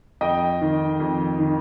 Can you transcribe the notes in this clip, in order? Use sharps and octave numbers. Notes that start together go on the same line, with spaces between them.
F2 D#5 G5
D#3
F2
D#3